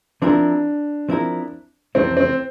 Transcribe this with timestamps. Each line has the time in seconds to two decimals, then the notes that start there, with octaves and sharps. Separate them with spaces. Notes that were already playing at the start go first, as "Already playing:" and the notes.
0.22 F3 C4 D4 E4 A#4
1.09 F3 C4 E4 A#4
1.95 F2 C3 E3 A3 C4 E4
2.17 C4